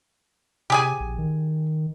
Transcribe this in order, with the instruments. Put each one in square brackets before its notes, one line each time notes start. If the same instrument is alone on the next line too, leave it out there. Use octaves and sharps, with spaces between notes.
[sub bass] C3 [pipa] G4 G#4 G#5
[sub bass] A#1
D#3